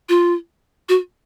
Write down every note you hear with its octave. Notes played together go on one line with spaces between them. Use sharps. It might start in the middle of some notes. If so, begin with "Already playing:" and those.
F4
F#4